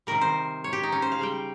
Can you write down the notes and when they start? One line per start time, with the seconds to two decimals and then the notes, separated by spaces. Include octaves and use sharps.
0.07 C3 D#3 G3 A#4
0.21 C5
0.64 C#5
0.73 G4
0.83 D#4
0.92 C#4
1.02 C5
1.12 F5
1.19 C#3 G3 G5